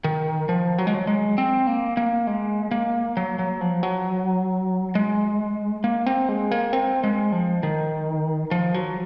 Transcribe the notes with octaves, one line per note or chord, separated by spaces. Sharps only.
D#3
F3
F#3
G#3
F#3
G#3
C4
A#3
A#3
G#3
A#3
F#3
F#3
F3
F#3
G#3
A#3
C4
G#3
A#3
C4
G#3
F3
D#3
F3
F#3